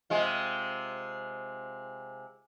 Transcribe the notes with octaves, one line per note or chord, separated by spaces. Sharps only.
C3 G#3 F4